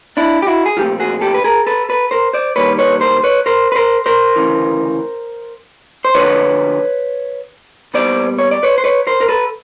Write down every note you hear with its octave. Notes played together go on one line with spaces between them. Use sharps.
D4 E4
G4
E4 F#4
G#4
A#2 F3 A3 C4 F4 G4
F#4 G#4
G4 A4
B4
G#4 A#4
A4 B4
A4 B4
A#4 C5
C5 D5
C2 C3 D#3 G3 A#3 B4 C#5
B4 C#5
A#4 C5
B4 C#5
A#4 C5
B4
A#4 C5
A#4 C5
D2 C#3 E3
C5
D2 D3 F3 B4 C#5
A#2 G3 B3 C5 D5
C#5
D5
B4 C#5
C5
B4 C#5
A#4 C5
A#4
A4 B4